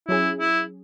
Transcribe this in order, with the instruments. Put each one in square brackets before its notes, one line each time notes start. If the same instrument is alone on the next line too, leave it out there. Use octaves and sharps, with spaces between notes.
[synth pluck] F#3 C#4 G#4 [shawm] E4
[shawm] E4